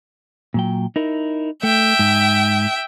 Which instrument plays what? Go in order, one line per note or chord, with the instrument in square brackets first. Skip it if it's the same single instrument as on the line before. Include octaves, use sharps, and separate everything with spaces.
[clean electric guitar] A#2 F#3 G5
D#4 E4 A#4
[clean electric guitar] A3 [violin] E5 G5
[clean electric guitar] G#2